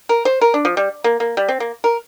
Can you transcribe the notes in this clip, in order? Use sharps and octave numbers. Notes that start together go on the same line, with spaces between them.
A#4
C5
A#4
D4
F3
G3
A#3
A#3
G3
C4
A#3
A#4